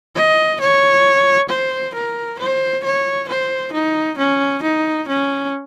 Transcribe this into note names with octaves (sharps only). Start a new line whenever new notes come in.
D#5
C#5
C5
A#4
C5
C#5
C5
D#4
C#4
D#4
C#4